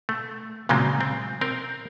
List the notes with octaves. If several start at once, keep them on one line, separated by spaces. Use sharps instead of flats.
A3
A#2 C#3 F#3 G#3 C4
C4
C4 A#4